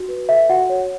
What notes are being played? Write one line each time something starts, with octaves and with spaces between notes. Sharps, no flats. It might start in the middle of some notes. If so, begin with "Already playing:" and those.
Already playing: F#4
B4
A4 E5
F#4 F#5
C#5